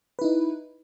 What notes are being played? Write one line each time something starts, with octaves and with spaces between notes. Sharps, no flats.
D#4 E4 B4